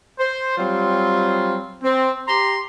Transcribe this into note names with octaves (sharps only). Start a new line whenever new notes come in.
C5
F#3 G3 C4 F4
C4
G4 A#5 C6